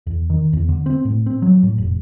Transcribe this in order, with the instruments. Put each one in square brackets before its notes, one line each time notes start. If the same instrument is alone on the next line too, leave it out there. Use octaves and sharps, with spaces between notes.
[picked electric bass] E2
D#3
E2
D3
C4
A2
C4
F#3
A2
F1